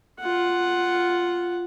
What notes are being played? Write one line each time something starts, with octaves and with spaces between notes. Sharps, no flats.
F4 F#5